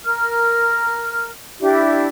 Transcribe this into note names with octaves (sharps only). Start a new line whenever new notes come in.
A#4 F6
D4 E4 G4